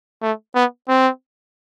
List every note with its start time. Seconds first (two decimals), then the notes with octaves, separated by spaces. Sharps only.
0.22 A3
0.55 B3
0.88 C4